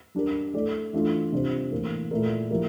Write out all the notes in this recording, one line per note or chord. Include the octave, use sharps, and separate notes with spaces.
G3 D4 G4 A#4
A3 E4 A4 D5
E3 A3 D4 F4
C3 G3 D4 F4 C5
A2 E3 A#3
A#2 A3 E4 A#4
F3 A#3 E4 G4 A#4